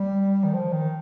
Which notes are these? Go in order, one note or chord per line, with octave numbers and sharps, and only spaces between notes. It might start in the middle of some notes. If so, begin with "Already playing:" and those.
Already playing: G3
D#3
F3
D#3